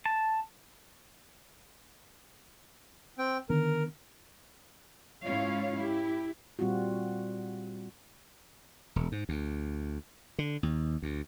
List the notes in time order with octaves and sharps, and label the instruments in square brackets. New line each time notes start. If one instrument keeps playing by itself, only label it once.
[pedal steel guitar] A5
[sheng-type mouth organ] C4 G5
[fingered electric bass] D3 D#3 B3 [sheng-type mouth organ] A#4
[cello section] G#2 C#4 E4 F4 C#5 F5
E4 G4
[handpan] A#2 G3 C4 F4 F#4
[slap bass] E1
G#2
D2
D3
D#2
D2